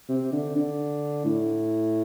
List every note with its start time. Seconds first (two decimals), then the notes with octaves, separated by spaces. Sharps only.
0.09 C3
0.32 D3
0.56 D3
1.25 A2